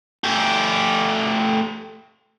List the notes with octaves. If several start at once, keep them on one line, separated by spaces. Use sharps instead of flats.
A3 G4